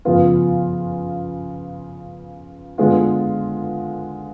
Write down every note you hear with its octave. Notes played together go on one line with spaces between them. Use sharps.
C#3 F3 B3 F4
D3 G#3 B3 F4